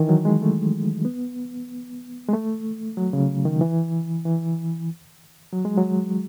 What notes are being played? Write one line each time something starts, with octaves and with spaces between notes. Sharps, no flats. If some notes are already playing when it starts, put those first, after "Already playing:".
Already playing: D#3 E3
F#3
G#3
A3
B3
G#3
A3
F#3
C#3
D#3
E3
E3
F#3
G#3
F#3